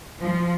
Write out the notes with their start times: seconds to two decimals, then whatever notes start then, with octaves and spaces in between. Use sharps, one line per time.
0.21 F3